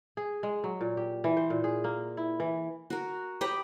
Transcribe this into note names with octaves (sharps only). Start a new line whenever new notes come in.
G#4
G#3
F#3
A#2
G4
E3
C5
A#2
G#4
A#3
E4
E3
F#4 A#4
G4 D#5 G5 B5